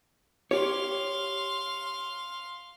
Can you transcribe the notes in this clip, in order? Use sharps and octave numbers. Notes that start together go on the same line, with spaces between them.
G4 C#5 F5 C6